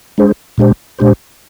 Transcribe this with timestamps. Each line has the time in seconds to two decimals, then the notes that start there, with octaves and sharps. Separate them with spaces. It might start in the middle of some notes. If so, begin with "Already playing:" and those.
0.18 G#3 D4 G#4 C5
0.58 A#2 G#3 D4 G4 C5
0.99 A#2 G#3 D4 G4 C5